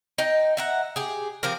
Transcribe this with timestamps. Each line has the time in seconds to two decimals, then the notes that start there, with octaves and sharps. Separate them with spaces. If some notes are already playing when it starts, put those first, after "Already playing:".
0.18 D#4 G5
0.57 E5 F#5 A#5
0.96 G4 G#4
1.43 F3 C4 G4 A#4